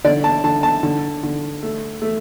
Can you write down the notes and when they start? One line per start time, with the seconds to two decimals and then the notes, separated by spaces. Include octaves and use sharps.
0.04 D3 D5
0.24 A5
0.44 D3 A5
0.63 A5
0.83 D3
1.23 D3
1.63 A3
2.02 A3